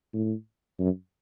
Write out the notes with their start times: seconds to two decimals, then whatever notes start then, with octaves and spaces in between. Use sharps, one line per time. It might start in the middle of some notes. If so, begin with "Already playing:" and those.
0.13 A2
0.79 F#2